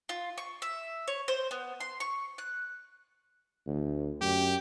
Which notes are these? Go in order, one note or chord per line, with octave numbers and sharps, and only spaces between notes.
F4
C#6
E5
C#5
C5
B3
C6
C#6
F#6
D2
F#2 G4